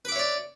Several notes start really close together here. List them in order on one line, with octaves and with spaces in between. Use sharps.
B4 D6 E5 C#5 D5